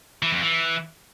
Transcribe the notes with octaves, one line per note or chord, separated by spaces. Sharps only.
E3
F2
E3